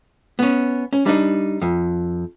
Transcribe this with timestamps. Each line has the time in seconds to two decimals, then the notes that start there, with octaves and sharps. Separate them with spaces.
0.39 B3 C#4
0.93 C#4
1.06 G3 D4 D#4
1.62 F2